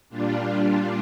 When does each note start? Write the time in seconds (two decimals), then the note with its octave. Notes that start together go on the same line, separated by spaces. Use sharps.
0.09 A#2 G3 D4 F4